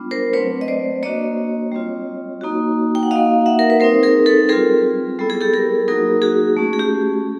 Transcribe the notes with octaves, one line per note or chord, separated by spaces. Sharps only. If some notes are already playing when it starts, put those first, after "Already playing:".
Already playing: G3 B3 D4 F4
A#4 C5
F#3 A3 C4 B4 C#5
D#5
C5 D5
A#3 D4 F#4 C#5 D#5
G3 C4 F4
A#3 D#4 F#4
G5
F#5
A#3 D#4 F#4 D#5 F5
E5 F#5
A#4
B4
G3 C4 D#4 A#4 C5
G#4 A#4
A4 B4
G3 C4 F4 G#4 A#4
G3 B3 E4 A4
G#4
G4 A4
G#4 A#4
F#3 A#3 D#4 F#4 G#4 A#4
F#4 G#4
A3 C#4 F#4
G#4
G4